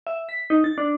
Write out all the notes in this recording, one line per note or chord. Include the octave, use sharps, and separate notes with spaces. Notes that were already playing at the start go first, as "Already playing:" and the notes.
E5
B6
D#4
A6
D4